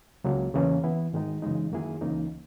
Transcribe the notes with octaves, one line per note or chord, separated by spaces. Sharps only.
C#2 C#3 F#3 A#3
E2 C#3 E3 A#3 C#4
E3 B3 E4
G#2 D#3 G#3 D#4
F#2 C#3 E3 G#3 D#4
F#2 D#3 A#3 E4 G#4
C#2 C#3 E3 A#3 D#4